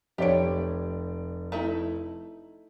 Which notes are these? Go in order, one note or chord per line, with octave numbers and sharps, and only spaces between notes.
F1 G4 C#5 D5 D7
A3 D#4 E4